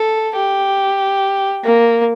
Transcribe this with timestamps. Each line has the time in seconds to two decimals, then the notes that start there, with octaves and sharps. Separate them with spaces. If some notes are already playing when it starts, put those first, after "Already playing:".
Already playing: A4
0.35 G4
1.64 A#3